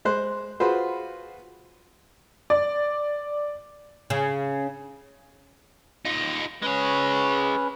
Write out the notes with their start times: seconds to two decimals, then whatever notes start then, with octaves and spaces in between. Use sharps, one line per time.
0.05 G#3 C5 F#6
0.60 F4 F#4 G#4 B4 C5
2.50 D5
4.10 C#3
6.05 D#4 F4
6.63 G#3 C#4 B4 C#5